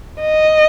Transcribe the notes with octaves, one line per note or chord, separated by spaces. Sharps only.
D#5